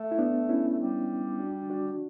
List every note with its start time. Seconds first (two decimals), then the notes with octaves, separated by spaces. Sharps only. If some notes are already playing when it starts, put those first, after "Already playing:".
Already playing: A3
0.12 E4
0.19 B3 D4
0.49 C#4 E4
0.70 A3
0.80 G3
1.40 D4 F#4
1.70 D4 F#4